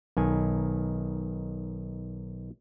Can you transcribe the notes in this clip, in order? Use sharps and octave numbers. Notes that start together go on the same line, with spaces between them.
B1 D#3 G#5